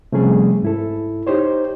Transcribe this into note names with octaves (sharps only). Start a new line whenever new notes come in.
C3 F3 G3 A3 C#4 G#4
G#2 E4 A4
D#4 G4 C5 C#5